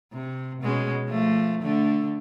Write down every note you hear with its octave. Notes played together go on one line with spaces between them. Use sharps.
C3
B2 G#3 C#4
F3 A3
D3 A3